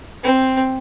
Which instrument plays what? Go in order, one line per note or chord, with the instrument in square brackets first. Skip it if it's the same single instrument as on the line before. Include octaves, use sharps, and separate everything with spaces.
[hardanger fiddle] C4